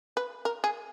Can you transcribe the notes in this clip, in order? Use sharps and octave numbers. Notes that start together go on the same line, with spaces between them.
B4
A#4
G#4